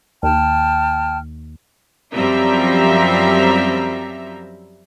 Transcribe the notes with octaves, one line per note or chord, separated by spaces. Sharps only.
D#2 G5 A5 F6
F#2 F3 G3 C4 E5 A#5